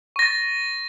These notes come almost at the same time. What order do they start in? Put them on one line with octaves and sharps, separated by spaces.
C#6 A#6 A6